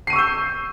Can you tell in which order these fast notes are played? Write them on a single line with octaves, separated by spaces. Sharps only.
C7 D#7 C#6 E6 G6